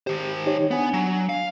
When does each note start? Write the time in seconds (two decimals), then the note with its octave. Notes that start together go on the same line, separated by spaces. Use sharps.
0.07 D#3 G4 C5
0.46 D#4 G4 C#5
0.71 B3 D4 G#5
0.93 F#3
1.29 F5